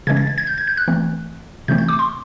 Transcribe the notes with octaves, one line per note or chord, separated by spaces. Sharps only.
C#3 E3 G#3 C#4 G#6
A6
G#6
G#6
G6
G#6
G6
F#6
E3 A3 C4
C3 E3 A3 C4 G6
G6
D6
C6